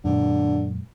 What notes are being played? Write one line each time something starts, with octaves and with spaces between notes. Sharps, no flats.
F#2 A#2 D3 G#3